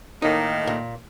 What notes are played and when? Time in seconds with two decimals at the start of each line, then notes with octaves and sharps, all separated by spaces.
0.22 A2 D#3 A#3 D#4
0.67 A#2